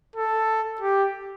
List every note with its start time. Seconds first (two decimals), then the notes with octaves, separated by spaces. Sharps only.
0.16 A4
0.81 G4